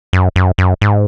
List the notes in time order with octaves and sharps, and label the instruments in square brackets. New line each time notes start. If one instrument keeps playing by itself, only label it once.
[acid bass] F#2
F#2
F#2
G#2